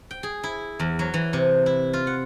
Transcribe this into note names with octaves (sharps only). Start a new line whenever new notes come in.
G5
G#4
E4
E2
F#3
E3
C3
E4
F4
F#5